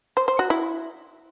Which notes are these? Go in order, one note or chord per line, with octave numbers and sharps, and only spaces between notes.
C5
C5
F#4
E4